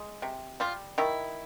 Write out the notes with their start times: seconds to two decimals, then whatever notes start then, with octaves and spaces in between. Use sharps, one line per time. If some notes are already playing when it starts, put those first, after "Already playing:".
Already playing: G#3
0.22 C3
0.60 G3 F4
0.98 D#3 E4